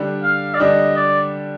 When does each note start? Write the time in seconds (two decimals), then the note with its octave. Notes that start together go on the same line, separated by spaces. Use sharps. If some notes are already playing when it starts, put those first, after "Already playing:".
Already playing: D3 G3 D4
0.23 F5
0.54 D5
0.60 D3 G3 D4 D#5
0.96 D5